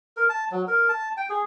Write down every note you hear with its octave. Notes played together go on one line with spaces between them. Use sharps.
A#4
A5
F#3
A#4
A5
G5
G#4